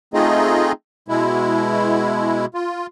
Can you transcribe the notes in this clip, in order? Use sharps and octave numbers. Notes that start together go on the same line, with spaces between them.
A3 C4 D#4 F4 G#4 D#5
B2 G#3 E4
F4